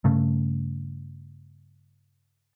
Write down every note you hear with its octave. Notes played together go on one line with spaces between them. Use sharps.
G2 C#3 A3